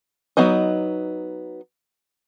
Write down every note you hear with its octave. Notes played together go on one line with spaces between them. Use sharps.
F#3 B3 D#4 D#5